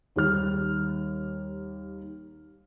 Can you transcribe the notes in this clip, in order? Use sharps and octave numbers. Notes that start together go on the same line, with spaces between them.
D#2 G3 F6